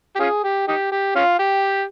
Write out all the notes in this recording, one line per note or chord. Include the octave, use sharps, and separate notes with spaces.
G4
C#4 F4 G#4
G4
D#4 G4
G4
C#4 F4
G4